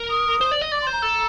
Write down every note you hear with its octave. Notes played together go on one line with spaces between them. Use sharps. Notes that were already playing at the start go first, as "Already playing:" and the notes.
Already playing: A#4
D#6
C5
D5
D#5
D5 D6
C6
C5
A#5
A4